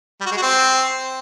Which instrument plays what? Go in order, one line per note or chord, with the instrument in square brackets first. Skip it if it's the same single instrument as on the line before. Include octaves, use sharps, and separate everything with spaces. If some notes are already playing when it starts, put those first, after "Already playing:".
[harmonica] G3
F#4
G#3
F#4
C4